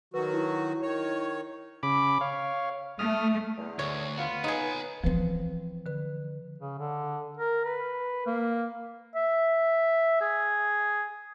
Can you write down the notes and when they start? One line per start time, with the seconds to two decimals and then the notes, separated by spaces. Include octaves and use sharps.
0.14 D#3 F#3 F#4 B4
0.34 E4
0.83 D#3 C#5
1.83 C#3 B5 D6
2.21 C#5 F5
2.99 A3 D#6 F6
3.57 E2 D3
3.79 D2 C#5
4.18 B3 F4
4.44 C#2 D#4 G#4 B4 C#5
5.04 E3 F3 C4 B4
5.86 D3 B4
6.59 C#3
6.79 D3
7.37 A#4
7.64 B4
8.26 A#3
9.16 E5
10.21 G#4